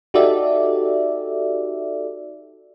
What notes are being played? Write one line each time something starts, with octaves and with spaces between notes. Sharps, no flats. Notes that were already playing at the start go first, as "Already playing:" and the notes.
D#4 F#4 G4 A4 D5 E5